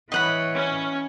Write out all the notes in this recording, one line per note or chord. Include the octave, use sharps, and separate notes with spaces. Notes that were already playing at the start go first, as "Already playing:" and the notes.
E3 C#5 D#5 F#5 B5
C#4